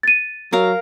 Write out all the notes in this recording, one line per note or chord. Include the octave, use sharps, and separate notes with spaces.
A6 D#7
F#3 A#4 F5 A#5